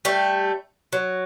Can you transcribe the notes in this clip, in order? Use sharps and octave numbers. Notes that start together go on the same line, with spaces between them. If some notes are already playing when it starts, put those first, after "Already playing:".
G3 A3
F#3